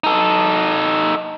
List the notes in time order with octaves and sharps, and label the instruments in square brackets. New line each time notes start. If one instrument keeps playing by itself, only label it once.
[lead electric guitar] D#4 A4